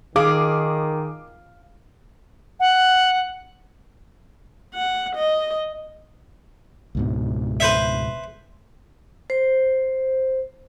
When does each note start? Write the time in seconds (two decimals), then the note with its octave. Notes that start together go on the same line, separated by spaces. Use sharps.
0.16 D#3 G#4 F5 D6
2.60 F#5
4.74 F#5
5.16 D#5
6.95 C#2 G#2 B2
7.60 B4 C5 E5
9.30 C5